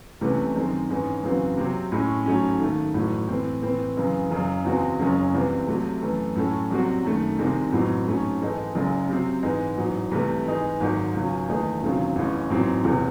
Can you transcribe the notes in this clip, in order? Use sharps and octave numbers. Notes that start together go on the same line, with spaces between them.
C2 C3 E3 A3 C#4
F#2 D#3 G#3 C4
G#2 E3 G#3 C#4
F#2 C#3 E3 C4 F#4
C3 F#3 C4
A2 G#3 C#4
G#2 F#3 A3 C#4
D#2 D#3 A3
A1 A2 F#3 A3
A2 E3 C4
A2 E3 C4
F#2 C#3 E3 G#3
F#1 F#2 C#3
E2 C#3 G#3 C4 F#4
F#1 F#2 C#3 G#3 C#4
C2 C3 E3 C4
C3 F#3 A3 C4
F#2 E3 A3
A2 F#3 C#4 F#4 A4
C2 C3 F#3 C4 F#4
F#2 D#3 A3
C2 C3 D#3 G#3 C4
A1 A2 F#3 C4
G#2 F#3 A3 C#4
G#2 E3 G#3 D#4 A4
F#1 F#2 C#3 G#3
C3 F#3 C4
G#2 E3 G#3 D#4
A1 G#2 F#3
C2 C3 E3 A3
G#2 E3 G#3 D#4 G#4
G#1 G#2 D#3 F#3
C#2 C#3 F#3 C#4
E2 D#3 A3 D#4 G#4
E1 D#2 C#3 F#3 C4
A1 A2 G#3 C#4
A1 G#2 F#3 C4
E1 E2 C3